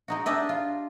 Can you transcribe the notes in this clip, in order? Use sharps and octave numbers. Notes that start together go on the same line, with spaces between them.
G#3 D#4 F#4
D4 G4 D#5 E5
F4